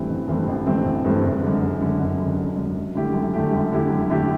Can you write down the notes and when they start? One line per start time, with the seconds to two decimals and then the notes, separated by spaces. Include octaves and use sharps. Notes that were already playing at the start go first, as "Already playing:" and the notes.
Already playing: G2 E3 A3 C4
0.09 A1
0.28 G2 E3 A3 C4
0.48 A1
0.66 G2 E3 A3 C4
0.85 A1
1.04 G2 E3 A3 C4
1.23 F#1
1.43 F#2 D3
1.61 F#1
1.81 F#2 D3
2.00 F#1
2.19 F#2 D3
2.38 F#1
2.57 F#2 D3
2.75 F#2
2.95 D3 A3 E4 G4
3.14 F#2
3.34 D3 A3 E4 G4
3.53 F#2
3.72 D3 A3 E4 G4
3.90 F#2
4.10 D3 A3 E4 G4